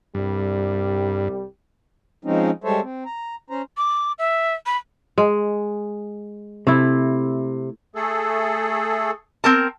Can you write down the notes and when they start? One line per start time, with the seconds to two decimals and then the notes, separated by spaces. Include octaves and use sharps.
0.15 C2 G2 G3
2.25 F3 G#3 C4 C#4 D#4
2.64 G3 G#3 A4 C5 C#5 E5
2.82 C4
3.06 A#5
3.50 C#4 C5 A#5
3.77 D6
4.19 E5
4.66 B5
5.18 G#3
6.67 C3 A3 E4
7.95 A3 G#4 A4
9.44 C4 A#4 A5